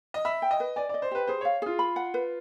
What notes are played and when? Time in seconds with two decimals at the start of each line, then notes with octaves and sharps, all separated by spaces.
0.14 D#5
0.25 E5 B5
0.42 G5
0.51 D#5
0.60 B4
0.76 D5 G#5
0.89 D5 D#5
1.02 C5
1.11 G4 B4
1.27 G#4 C5
1.41 C#5 F5
1.62 F4 G#4
1.79 B5
1.96 F#5
2.14 B4